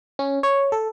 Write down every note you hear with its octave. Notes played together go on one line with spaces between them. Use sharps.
C#4
C#5
A4